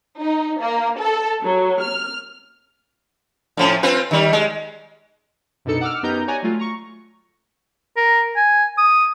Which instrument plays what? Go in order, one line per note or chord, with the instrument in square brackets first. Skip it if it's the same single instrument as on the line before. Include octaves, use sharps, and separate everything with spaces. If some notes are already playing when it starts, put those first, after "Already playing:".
[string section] D#4
A#3
A4
F#3
F6
[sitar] A2 F3 C#4
C4 F4 B4
D#3 G3
G#3
[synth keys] F#2 B2 D4 D#4 A4 C#7
F#5 D6 E6 F6
F#2 B3 D#4 G4 A#5 G6
C#5 D5 F#5 G#5 A#5
F#3 A3 F4
A#5 C#6
[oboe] A#4
G#5
D#6